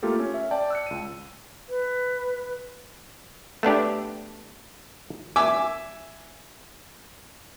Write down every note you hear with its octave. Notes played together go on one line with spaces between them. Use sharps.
A3 A#3 F4 G4 A4
C#4
E5
D5 G5 A5
E6 F#6 C#7
C#2 D#7
B4
A3 B3 D4 G4
E5 G#5 D6 E6